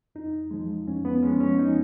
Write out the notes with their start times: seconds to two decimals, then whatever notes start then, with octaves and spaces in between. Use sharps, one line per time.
0.15 F2 D#4
0.51 F3 G#3
0.87 F2 C#4
1.05 B3
1.22 F3 G#3 C#4
1.40 C#4
1.58 F2 D#4